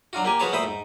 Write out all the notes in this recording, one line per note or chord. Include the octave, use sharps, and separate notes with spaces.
F#3 D4 F4 F#4
A#3 G4 G#5
F3 F#4 G#4 B4 C#5 A5
A#2 A3 C5 B5 D#6
G#2